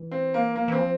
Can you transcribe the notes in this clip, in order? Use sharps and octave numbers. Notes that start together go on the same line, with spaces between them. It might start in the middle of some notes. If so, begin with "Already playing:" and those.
Already playing: E3
C4
A#3
F3 A#3
E3 C4
F3